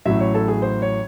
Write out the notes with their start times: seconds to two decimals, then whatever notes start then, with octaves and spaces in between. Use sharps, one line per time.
0.06 A1 A2 F#3 E5
0.20 C#5
0.34 A4
0.48 G#4
0.62 C5
0.82 C#5